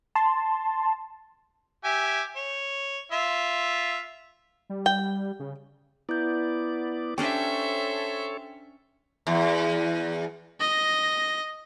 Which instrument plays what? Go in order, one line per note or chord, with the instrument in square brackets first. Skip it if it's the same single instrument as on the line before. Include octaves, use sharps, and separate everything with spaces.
[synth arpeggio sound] A5 C6
[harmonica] G4 E5 G#5
C#5
F4 E5
[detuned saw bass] G3
[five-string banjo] G5
[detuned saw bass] C#3
[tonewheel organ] B3 D5 [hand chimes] E4 G6
[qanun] C#4 D4 G4 [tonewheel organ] A4 C#5 [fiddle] C5 E5 [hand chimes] G5
[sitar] E2
[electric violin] D#5 A#6